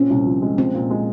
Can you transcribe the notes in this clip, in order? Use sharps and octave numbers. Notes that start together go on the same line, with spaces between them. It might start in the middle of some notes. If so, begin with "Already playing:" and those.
Already playing: A#2 C4 C#4
C2
F3
G#3
F3 C4
A#2
G#3